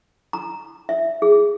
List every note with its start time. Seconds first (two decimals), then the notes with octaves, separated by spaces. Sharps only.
0.33 A#5
0.89 E5
1.22 G#4